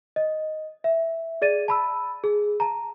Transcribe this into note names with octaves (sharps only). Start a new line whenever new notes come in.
D#5
E5
G#4 D5 A6 D#7
A5 B5 E6
G#4
A5 A#5